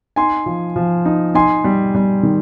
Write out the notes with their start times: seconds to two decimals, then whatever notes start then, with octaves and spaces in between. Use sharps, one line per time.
0.16 D#4 G#5 C6
0.46 F3
0.76 F3
1.05 D#4
1.34 D#4 G#5 C6
1.64 G3
1.95 G3
2.23 D#3